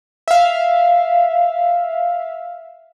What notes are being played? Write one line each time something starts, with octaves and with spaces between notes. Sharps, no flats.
E5 F5